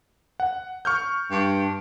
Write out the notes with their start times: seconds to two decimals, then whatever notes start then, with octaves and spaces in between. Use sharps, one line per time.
0.40 F#5
0.85 C#6 F6 G6
1.31 G2